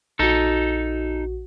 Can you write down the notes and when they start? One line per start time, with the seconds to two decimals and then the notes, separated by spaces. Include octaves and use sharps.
0.19 A#1 D#4 F#4 A4